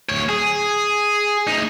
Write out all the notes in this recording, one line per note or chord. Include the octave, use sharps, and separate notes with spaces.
D2 C#5
G#4
D2 D#4